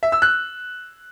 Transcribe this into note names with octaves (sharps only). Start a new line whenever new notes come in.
E5
E6
F#6